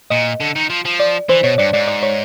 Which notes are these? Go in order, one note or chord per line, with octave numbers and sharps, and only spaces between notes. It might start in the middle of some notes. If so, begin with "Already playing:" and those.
A#2 D#5
D3
D#3
F3
F3
D5
E3 C5
B2 C#5
G2 D5
G#2 D5
D5
C#5